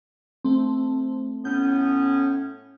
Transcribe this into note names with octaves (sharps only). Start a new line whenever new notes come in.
A3 C4
A2 B3 C#4 G6